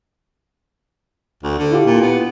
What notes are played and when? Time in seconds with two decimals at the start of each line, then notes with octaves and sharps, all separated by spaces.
1.43 D2
1.59 D3
1.71 E4 F4 G4
1.84 A#2
2.02 B3